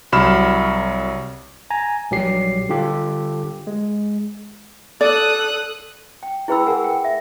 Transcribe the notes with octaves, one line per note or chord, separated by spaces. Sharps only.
C2 F#3 B5 F6 E7
G#5 A#5
A#1 F#3 G3 G4 C7
D3 G3 F4 G4 A4
G#3
A4 D5 D#6 F#6
G5
E4 G#4 B4 G5 B5 E6
G#4 A#4 F#5 G#5
G5
E5